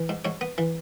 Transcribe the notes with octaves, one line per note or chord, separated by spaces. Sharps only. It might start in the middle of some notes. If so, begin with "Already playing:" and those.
Already playing: E3
G#2
G#2 C#5
B3
E3